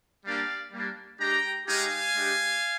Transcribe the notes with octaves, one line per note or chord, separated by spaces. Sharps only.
G3 A#3 D4 G4 D5 F5
G3 A#3 D4
G#3 D4 G4 G5 A#5
G#3 D#4 G4 F5 G#5
G#3 D4 G4